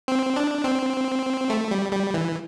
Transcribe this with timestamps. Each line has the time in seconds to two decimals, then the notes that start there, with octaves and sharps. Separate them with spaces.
0.08 C4
0.36 D4
0.64 C4
1.50 A3
1.71 G3
1.92 G3
2.14 E3